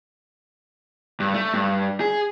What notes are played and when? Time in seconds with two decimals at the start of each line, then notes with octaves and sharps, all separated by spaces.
1.20 G2
1.34 A3
1.54 G2
2.00 G#4